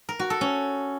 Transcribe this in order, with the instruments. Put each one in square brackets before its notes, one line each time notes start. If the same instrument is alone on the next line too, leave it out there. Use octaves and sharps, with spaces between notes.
[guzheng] A#4
F#4
A4
C#4